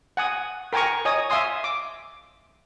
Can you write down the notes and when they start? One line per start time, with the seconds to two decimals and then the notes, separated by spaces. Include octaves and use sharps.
0.17 F#5 G#5 D#6
0.73 A#4 G5 G#5 A#5 C#6
1.05 C#5 D#5 G#5 D#6
1.30 E5 F5 G#5 C6 D#6
1.64 D6